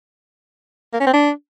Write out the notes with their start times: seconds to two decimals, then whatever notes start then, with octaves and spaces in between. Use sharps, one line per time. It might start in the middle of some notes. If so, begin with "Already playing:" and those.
0.93 A#3
1.00 C#4
1.07 C4
1.14 D4